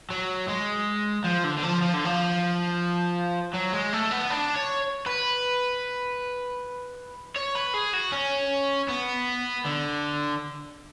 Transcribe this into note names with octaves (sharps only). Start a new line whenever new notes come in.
F#3
G#3
F3
D3
D3
F3
F3
D3
F3
F#3
G#3
A3
B3
D4
C#5
B4
C#5
B4
G#4
F#4
C#4
B3
D3